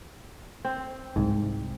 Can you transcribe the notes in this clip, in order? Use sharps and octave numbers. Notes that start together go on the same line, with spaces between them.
C4
C2 G#2